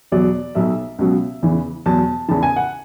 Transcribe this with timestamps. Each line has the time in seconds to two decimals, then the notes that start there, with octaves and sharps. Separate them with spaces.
0.12 E2 B2 F#3 D5
0.55 B1 B2 F#3 E5
0.99 C#2 B2 F#3
1.43 E2 C#3 E3
1.86 E2 B2 F#3 A5
2.29 E2 C#3 E3 A5
2.43 G#5
2.56 F#5